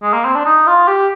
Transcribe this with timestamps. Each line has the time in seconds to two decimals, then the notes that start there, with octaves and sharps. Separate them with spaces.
0.03 G#3
0.13 A#3
0.25 C4
0.35 D4
0.46 D#4
0.67 F4
0.88 G4